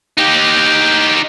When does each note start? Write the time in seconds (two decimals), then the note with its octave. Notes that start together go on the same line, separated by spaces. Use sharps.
0.17 D#4 G4